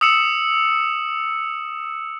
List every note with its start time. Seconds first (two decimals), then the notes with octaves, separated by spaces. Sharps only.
0.01 D#6 E6 C#7 E7